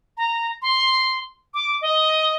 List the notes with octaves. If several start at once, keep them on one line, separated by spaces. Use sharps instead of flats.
A#5
C6
D6
D#5